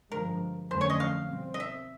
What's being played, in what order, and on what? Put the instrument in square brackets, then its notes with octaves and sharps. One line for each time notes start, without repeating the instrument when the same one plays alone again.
[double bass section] G2 D3 F3 G#3 [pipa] A#4
[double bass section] F2 D3 F#3 A3 C#4 [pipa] C5
[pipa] C#5
D#5
F5
[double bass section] B2 G3 C4
[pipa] D#5
E5